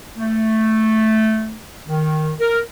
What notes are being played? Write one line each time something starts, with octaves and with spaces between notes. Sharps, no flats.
A3
D#3
A#4